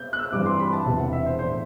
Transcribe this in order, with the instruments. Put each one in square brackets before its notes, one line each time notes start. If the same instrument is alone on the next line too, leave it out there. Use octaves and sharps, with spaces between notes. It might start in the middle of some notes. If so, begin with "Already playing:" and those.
Already playing: [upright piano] G6
F#6
E6
[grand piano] G2 E3 G3 C4 [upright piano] D6
[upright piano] C6
B5
A5
[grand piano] E1 E2 C3
[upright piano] F#5
E5
C5
[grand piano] A2 E3 B3 D4 [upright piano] C5